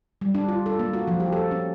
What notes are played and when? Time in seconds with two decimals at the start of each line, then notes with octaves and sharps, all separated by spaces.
0.21 G3
0.35 D4
0.48 F4
0.66 A4
0.79 A#3
0.93 F#4
1.08 F3
1.20 G4
1.32 A4
1.51 C#4